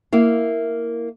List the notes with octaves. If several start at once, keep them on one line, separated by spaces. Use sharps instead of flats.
A#3 E4 F5